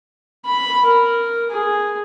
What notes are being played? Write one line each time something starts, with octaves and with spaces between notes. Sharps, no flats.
B5
A#4
G#4